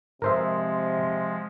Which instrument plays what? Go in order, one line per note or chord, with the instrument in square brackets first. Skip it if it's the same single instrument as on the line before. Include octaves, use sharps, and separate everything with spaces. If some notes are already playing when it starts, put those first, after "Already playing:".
[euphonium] C3 [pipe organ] F3 G#3 [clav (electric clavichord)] A#4 C5 E5